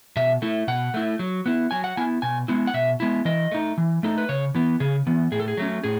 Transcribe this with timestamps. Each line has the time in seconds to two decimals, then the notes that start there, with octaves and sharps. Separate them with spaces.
0.16 B2 E5
0.42 A3 E4
0.68 B2 F#5
0.94 A3 E4
1.19 F#3
1.46 B3 E4
1.71 F#3 G#5
1.84 F#5
1.97 B3 E4 G#5
2.22 B2 G#5
2.48 G#3 B3 E4
2.67 F#5
2.74 B2 E5
3.00 G#3 B3 E4
3.25 E3 D#5
3.51 A3 D#4
3.78 E3
4.03 A3 D#4 A4
4.18 B4
4.29 C#3 C#5
4.55 E3 B3
4.80 C#3 G#4
5.07 E3 B3
5.32 A2 G#4
5.40 A4
5.48 G#4
5.57 F#3 A3 C#4
5.84 A2 G#4